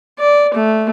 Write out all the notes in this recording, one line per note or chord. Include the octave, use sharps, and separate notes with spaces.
D5
A3